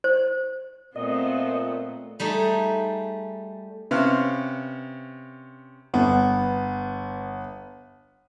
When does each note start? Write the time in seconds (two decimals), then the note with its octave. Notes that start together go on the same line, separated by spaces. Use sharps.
0.04 C5
0.96 A#2 A3 B3 C4 D#5
2.20 G3 A3 D#4 G#4
3.91 C3 B3 C#4 F5 F6 F#6
5.94 G1 B3